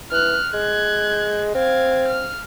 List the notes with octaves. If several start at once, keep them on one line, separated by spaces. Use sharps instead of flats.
E3 F6 F#6
G#3 F#6 G#6
C4 F5 G#6
F6